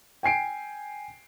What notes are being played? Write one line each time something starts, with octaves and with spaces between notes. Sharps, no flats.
G5 G#5 C7 D7